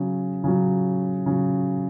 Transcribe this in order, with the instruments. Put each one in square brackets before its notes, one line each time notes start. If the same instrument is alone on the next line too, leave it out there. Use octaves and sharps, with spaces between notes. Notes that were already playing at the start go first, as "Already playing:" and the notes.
Already playing: [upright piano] C#3 F#3
C#3 F#3
C#3 F#3